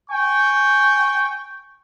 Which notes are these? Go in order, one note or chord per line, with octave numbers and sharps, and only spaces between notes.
G5 G#5 C#6